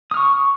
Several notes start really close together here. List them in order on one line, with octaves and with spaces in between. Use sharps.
D#6 F6 C#6